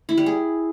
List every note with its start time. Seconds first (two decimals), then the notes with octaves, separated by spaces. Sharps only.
0.09 E4
0.18 G3
0.26 G#4